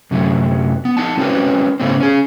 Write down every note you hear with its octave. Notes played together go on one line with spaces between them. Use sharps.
F#2 C3 F#3 A3
B3
D#4 F#5 A5
G#3 C4 C#4 F#4 A#4 B4
G#2 C#3 A3 B3 C4
C#4 G#4